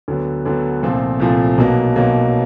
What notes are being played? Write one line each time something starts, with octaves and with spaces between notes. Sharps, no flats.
D2 D3 F#3 B3
D2 D3 F#3 B3
C2 A#2 F3 A3 C4
C2 A#2 F3 A3 C4
B1 B2 F#3 A#3
B1 B2 F#3 A#3